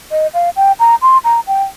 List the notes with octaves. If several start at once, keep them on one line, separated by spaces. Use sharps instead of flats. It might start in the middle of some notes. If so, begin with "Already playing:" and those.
D#5
F5
G5
A#5
C6
A#5
G5